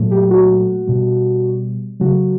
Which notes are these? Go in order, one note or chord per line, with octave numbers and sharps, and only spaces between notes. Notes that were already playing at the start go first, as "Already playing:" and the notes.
Already playing: A#2 F#3 A3
G4
F#4
B2 G3
C#3 F#3 A3 F#4